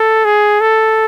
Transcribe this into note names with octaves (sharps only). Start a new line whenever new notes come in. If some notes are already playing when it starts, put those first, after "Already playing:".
Already playing: A4
G#4
A4